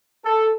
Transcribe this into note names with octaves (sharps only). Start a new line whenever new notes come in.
A4